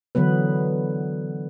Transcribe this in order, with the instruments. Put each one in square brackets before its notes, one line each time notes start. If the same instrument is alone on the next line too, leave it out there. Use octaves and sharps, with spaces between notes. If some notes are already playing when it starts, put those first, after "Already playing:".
[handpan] D3 E3 F#3 B3 B4